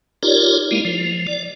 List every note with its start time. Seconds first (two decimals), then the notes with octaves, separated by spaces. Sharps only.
0.23 D#4 F4 G4 A#4 C#5 D5
0.71 G#3 A#3 E4
0.85 F3
1.27 D5